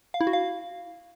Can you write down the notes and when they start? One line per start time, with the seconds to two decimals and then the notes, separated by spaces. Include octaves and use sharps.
0.14 F5
0.21 E4
0.27 F#4
0.33 F5